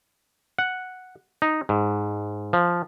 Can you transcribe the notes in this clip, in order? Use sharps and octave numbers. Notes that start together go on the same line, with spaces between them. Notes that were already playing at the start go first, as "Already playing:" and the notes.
F#5
D#4
G#2
F3